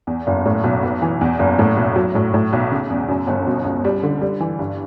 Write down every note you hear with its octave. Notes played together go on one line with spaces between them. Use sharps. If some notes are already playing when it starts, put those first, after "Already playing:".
E2
F#1
A2
B1
B3
E3
E2
F#1
A2
B1
F#3
A2
A2
B1
C#3
E2
F#2
G1
B2
C#2
G3
D3
G3
E3
G2